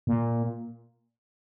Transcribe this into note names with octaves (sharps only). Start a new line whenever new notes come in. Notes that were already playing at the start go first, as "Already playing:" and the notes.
A#2